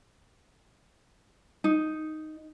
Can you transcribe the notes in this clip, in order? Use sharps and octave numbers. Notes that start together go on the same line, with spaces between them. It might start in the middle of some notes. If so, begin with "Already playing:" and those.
D#4